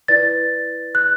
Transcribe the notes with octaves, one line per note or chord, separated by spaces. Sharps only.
E4 B4 D5 A6
F#6